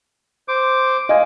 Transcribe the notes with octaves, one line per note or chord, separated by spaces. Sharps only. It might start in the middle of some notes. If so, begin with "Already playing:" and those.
C5 D6
D#5 F5 G#5